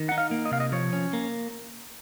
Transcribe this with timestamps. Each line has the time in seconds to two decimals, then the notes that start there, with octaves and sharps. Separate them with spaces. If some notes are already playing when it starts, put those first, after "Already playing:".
Already playing: D#3
0.09 D#4 F#5
0.18 F5
0.31 A#3
0.45 D#5
0.51 C3 F5
0.60 D#5
0.72 F3 C#5
0.93 C#4
1.13 A#3